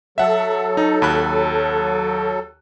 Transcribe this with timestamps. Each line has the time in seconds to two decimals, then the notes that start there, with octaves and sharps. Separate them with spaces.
0.18 F#3 A4 E5 F#5
0.77 D#4
1.02 D#2 B5 F#6